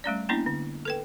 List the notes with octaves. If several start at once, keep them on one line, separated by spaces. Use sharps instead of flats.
G3 A3 C#4 D5
A#3 B3 C#4 D4 E4
D3
A4 B4 G5